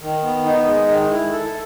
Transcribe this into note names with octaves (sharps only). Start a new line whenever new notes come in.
D#3
B3
D#4
G#3
D#3
E4
A4